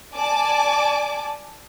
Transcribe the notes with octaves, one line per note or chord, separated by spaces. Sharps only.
D5 G#5 A5 D6